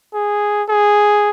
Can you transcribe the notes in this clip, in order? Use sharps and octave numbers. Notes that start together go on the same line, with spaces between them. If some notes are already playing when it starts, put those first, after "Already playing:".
G#4
G#4